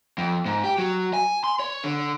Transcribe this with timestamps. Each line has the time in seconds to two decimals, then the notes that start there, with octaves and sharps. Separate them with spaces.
0.18 F2
0.46 G#2
0.64 G4
0.78 F#3
1.14 G#5
1.44 C6
1.59 C#5
1.84 D3